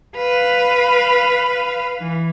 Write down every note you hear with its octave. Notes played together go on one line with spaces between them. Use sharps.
B4 F5
E3